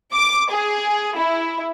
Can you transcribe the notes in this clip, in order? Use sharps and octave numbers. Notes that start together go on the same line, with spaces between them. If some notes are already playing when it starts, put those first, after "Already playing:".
D6
G#4
E4